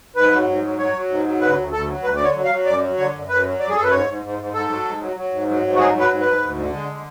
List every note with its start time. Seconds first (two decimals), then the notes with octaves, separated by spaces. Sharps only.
0.16 G#2 B4
0.32 F#3
0.47 G#2
0.63 F#3
0.79 F#3 C#5
0.95 F#3
1.09 G#2
1.25 F#3
1.41 D2 B4
1.57 D2
1.72 D2 A4
1.88 F#3
2.04 D2 B4
2.16 D5
2.20 D3 C#5
2.35 F#3
2.45 F5
2.51 F#3
2.66 F#2 D5
2.81 F#3
2.97 D3 C#5
3.13 F#2
3.28 F#2 B4
3.45 F#3
3.60 F#2 D5
3.69 G#4
3.75 F#2 A4
3.84 B4
3.91 G#2 C#5
4.07 G#2
4.22 G#2
4.39 G#2
4.53 G#2 A4
4.69 F#3
4.85 G#2
5.01 F#3
5.16 F#3
5.32 G#2
5.47 F#3
5.63 G#2
5.75 F#4
5.79 F#3 G#4
5.94 F#3
6.00 B4
6.10 G#2
6.21 B4
6.26 G#2
6.42 D2
6.57 D3
6.73 G#3
6.88 D3